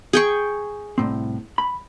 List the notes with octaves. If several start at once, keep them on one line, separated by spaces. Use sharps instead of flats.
G#4 G5 C#6
C2 A2 C4
B5